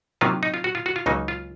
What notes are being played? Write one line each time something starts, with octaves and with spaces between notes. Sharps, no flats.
C3 D#3 F#3 A#3 C#4 F4
D#4
F4
F#4
F4
F#4
F4
C#2 C#3 F#3 A#3 D#4
F4